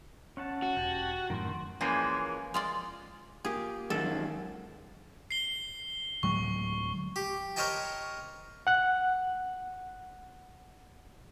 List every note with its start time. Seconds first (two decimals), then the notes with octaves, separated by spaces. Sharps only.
0.37 C#4 F#5 A5
0.62 F#4
0.77 E1 G4 A5
1.30 F#2 A2 D#3 C6
1.81 E3 F3 G#3 A#3 C#4
2.54 G#3 F4 D5
3.45 A#3 F4 G4 G#4
3.90 F#2 D#3 G#3 A4
5.31 C7 G7
6.23 D1 F#3 G#3 C#6
7.16 G4
7.56 A#4 C5 C#5 D#5 G5 A5
8.67 F#5 F#6